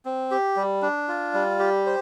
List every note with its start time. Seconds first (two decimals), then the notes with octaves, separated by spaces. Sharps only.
0.05 C4
0.31 G4
0.56 G3
0.82 D4
1.08 F4
1.34 G3
1.59 G4
1.86 C5